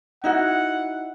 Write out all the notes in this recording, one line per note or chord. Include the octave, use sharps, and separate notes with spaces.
D#4 E4 F#4 F#5